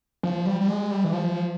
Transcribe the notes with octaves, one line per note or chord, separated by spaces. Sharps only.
F3
G3
G3
G#3
G3
E3
F3